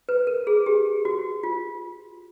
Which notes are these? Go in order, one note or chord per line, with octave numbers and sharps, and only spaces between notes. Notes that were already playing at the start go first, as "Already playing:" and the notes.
B4
A#4
G#4
G4
F#4
F4